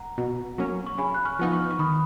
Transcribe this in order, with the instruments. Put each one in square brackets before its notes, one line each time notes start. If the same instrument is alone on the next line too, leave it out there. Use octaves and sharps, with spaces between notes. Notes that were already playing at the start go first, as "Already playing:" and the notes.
Already playing: [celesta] F#5 A#5
[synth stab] B2
F#3 A#3 C#4
[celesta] C#6
[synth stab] C#3 [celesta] G#5 B5
[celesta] F#6
C#6 F6
[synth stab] F3 B3 D#4
[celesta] C#6 F6
C#6
[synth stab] D#3 [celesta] B5 D#6